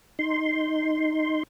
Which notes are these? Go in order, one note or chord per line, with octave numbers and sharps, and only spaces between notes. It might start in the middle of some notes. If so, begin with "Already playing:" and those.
D#4 C6